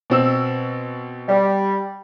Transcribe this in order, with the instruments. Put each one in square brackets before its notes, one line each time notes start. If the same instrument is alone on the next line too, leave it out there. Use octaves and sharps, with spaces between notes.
[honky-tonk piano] B2 C4 E6
[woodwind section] G3